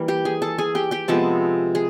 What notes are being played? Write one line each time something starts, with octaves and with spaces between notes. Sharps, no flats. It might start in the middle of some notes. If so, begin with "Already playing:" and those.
Already playing: E3 G3 A#3
G4 G5
G#4 G#5
A4 A5
G#4 G#5
G4 G5
G4 G5
C3 F3 G#3 B3 A4 A5
G#4